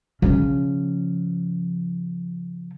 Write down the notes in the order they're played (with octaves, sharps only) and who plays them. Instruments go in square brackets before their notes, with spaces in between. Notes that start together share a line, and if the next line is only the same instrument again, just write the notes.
[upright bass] C#3 F3